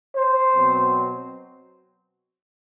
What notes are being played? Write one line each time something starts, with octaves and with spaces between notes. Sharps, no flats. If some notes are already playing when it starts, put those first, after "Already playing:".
C5
B2 F#3 C4